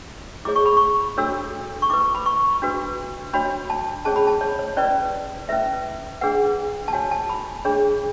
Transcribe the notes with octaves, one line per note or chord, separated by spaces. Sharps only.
E4 G#4 C#5 D6
C#6
B5
C#6
D4 F#4 A4 C#5 E6
C#6
E4 B4 D6
B5
C#6
D4 F#4 B4
D4 F#4 C#5 B5
A5
C#4 G#4 C#5 A5
B5
A5
C#5
C#5
C#4 E4 B4 D5
C#4 E4 B4 E5
D4 G#4 B4 F#5
A5
F#4 C#5 G#5
A5
B5
D4 G#4 C#5